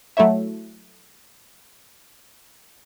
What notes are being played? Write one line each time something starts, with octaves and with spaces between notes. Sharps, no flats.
F#3 A3 E4 C#5 E5